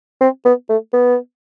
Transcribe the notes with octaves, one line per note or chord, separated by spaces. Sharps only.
C4
B3
A3
B3